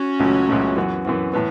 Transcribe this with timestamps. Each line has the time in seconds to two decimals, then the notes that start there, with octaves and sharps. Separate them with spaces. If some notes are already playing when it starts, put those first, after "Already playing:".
Already playing: C#4 F#4
0.20 C#2 C#3 F#3 A3
0.49 C#2 C#3 F#3 A3
0.76 F#2 E3 B3 F#4
1.05 F#2 E3 B3 F#4
1.33 A2 E3 B3